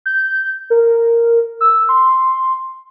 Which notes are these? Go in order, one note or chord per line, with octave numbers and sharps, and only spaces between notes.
G6
A#4
E6
C6